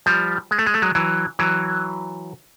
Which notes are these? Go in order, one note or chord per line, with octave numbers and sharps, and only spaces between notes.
F3 G3
G#3
A3
G#3
A3
F#3 G#3
E3 F#3
E3 F#3